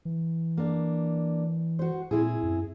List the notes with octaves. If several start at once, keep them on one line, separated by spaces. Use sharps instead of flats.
E3
A#3 D4
F#4 C5
A#2 C4 E4 G#4
F#2